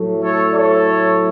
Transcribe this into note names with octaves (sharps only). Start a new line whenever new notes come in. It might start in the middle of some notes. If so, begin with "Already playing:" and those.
Already playing: A2 F#3 A3
A4 C#5
A4 C#5